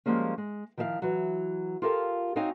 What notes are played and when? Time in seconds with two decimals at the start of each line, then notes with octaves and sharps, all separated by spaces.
0.06 F3 G3 G#3 A#3 C#4
0.38 G#3
0.77 D#3 F3 E4 E5 F5
1.02 E3 F#3
1.82 F4 G4 A4 A#4 D5 F5
2.36 C4 D#4 F#4 C#5 F5 G#5